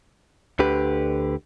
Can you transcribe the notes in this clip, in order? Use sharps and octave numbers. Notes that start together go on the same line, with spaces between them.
D2 D3 G4 B4